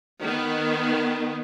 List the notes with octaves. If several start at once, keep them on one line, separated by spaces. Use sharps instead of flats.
D#3 B3